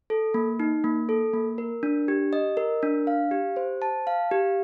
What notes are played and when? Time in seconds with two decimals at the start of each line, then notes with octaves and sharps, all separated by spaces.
0.10 A4
0.34 A#3
0.60 D#4
0.84 A#3
1.09 A4
1.33 A#3
1.58 A#4
1.83 D4
2.08 G4
2.33 D#5
2.57 A#4
2.83 D4
3.07 F5
3.31 G4
3.56 C5
3.82 A5
4.07 F5
4.31 G4